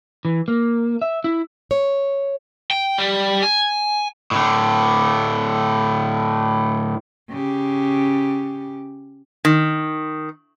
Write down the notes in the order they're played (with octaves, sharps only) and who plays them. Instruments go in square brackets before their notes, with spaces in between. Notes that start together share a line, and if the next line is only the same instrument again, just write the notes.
[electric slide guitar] E3
A#3
E5
E4
[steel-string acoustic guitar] C#5
[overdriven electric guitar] G5
G3
G#5
A2 D3
[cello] C#3 G4
[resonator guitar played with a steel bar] D#3